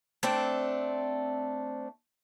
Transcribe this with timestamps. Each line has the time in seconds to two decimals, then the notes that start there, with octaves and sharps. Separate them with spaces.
0.23 A3 C4 D4